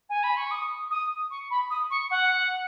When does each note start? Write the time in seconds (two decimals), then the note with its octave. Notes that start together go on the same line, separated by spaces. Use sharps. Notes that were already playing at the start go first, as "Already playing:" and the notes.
0.09 G#5
0.23 B5
0.36 C#6
0.51 D#6
0.90 D#6
1.30 C#6
1.50 B5
1.70 D#6
1.90 C#6
2.10 F#5